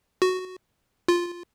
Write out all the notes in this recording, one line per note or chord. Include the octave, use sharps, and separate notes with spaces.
F#4
F4